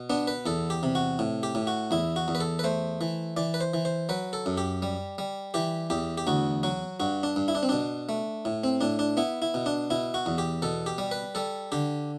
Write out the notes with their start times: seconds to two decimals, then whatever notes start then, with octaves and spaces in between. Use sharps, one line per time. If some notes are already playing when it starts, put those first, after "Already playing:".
Already playing: B2
0.10 B3 D4
0.27 B4
0.46 E2 A4
0.70 G4
0.83 C3
0.95 F#4
1.19 A2
1.43 G4
1.55 A2
1.67 F#4
1.91 E2 E4
2.16 F#4
2.28 E2
2.35 B4
2.40 A4
2.59 B4
2.64 A3 C5
3.01 E3
3.37 E3 D5
3.54 B4
3.61 C5
3.74 E3
3.85 C5
4.09 F#3 B4
4.33 A4
4.46 F#2
4.58 G4
4.82 G3
5.18 G3
5.54 E3 G4
5.90 E2 G4
6.18 G4
6.27 D2 F#4
6.63 F#3 F#4
7.00 G2 F#4
7.23 D4
7.36 G2
7.48 E4
7.55 D4
7.63 C4
7.69 B2 D4
8.09 A3
8.45 A2
8.64 C4
8.81 A2 D4
8.99 D4
9.17 B3 E4
9.42 E4
9.54 B2
9.66 D4
9.90 B2 E4
10.14 F#4
10.26 E2
10.38 G4
10.62 B2 A4
10.86 G4
10.98 G3
11.11 B4
11.35 G3 A4
11.72 D3 G4